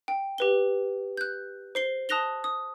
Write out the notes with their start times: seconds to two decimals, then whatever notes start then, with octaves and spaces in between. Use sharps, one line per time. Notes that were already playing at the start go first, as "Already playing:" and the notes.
0.08 G5
0.38 G4 B4 G7
1.17 F#6 G6
1.75 C5 C7 G7
2.09 A5 D#6 F#6 A#6 F7 G7
2.44 D#6